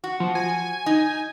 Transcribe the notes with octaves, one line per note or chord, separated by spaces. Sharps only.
F#4
F3
G#5
D#4